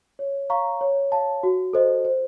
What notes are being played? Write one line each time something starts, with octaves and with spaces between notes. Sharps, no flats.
C#5
F5 A#5 C#6
C#5
F5 A5
F#4
A4 C5 D#5
C5